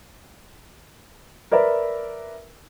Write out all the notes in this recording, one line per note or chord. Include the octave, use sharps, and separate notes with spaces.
A#4 B4 D5 E5